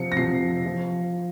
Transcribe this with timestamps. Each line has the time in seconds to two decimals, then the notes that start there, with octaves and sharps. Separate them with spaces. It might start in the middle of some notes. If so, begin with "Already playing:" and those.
Already playing: C3 F3 C4 C#7
0.12 A#6
0.16 C3 F3 C4 C7
0.66 F3